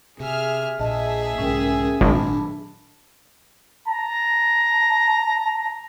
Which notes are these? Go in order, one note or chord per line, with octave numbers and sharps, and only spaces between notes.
C3 G#4 E5 F6
A#1 A#2 G#4 D#5 E5 A5
B1 G#2 C#3 C#4 A#4 G5
G#1 A#2 D#3 F#3 D4 A5 B5
A5 A#5